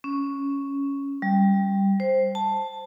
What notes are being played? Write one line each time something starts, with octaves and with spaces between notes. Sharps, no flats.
C#4
G3
C5
A5